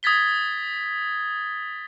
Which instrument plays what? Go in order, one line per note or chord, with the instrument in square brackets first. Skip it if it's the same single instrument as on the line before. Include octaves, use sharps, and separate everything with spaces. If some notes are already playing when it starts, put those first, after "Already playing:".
[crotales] D#6 G#6 A6 B6 G7